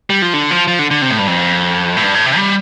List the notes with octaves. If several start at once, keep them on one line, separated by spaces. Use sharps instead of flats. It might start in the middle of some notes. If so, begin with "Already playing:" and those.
G3
F3
D3
F3
F3
D3
D3
C3
A2
G2
F2
A2
G2
A2
C3
G3